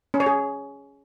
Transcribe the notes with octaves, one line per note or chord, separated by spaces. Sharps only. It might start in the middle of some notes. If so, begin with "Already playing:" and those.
C#4
C#5
G#4